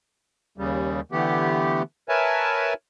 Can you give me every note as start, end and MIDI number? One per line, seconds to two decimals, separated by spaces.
0.58 1.01 39
0.58 1.01 49
0.58 1.01 55
1.12 1.82 50
1.12 1.82 52
1.12 1.82 57
1.12 1.82 59
1.12 1.82 67
2.09 2.74 70
2.09 2.74 71
2.09 2.74 73
2.09 2.74 76
2.09 2.74 80
2.09 2.74 81